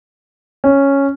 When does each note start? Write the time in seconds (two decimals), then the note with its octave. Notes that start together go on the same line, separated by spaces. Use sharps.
0.64 C#4